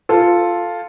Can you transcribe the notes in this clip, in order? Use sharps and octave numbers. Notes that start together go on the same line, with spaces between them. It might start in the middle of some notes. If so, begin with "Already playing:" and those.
F4 A4